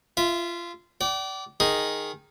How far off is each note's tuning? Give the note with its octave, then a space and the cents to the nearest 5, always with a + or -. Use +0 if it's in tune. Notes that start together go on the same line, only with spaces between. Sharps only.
F4 -20 E5 +0
D5 -15 G5 -45
D#3 +0 D#4 +0 G#4 +0